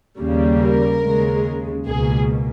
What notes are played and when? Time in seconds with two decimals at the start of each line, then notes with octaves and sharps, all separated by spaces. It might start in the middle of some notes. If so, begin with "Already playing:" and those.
0.19 D#2 C#3 G3 A#3
0.62 A#4
1.03 D#2 C#3 G#3
1.86 C#2 B2 A#3 G#4